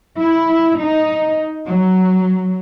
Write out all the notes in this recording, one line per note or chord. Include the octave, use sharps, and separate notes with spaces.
E4
D#4
F#3